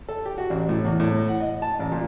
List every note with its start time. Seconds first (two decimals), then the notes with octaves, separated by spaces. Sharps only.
0.09 A4
0.25 G4
0.38 F#4
0.50 A1
0.69 A2
0.85 E2
1.00 A2
1.28 F#5
1.40 D#5
1.62 A5
1.79 A1
1.92 A#2